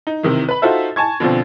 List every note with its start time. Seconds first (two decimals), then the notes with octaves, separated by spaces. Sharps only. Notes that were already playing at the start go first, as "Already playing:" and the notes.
0.07 D#4
0.23 C3 D#3 E3
0.49 B4 B5
0.62 D#4 F4 F#4 A4 C5 E5
0.96 G#5 A5 C#6 G#6
1.20 B2 D3 F3 C4